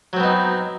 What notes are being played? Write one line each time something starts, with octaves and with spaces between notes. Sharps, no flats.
F#3 B3 C4 D#4